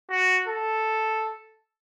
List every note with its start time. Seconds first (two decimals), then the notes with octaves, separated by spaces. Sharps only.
0.10 F#4
0.47 A4